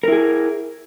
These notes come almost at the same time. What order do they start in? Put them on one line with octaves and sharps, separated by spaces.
A#4 E4 G#4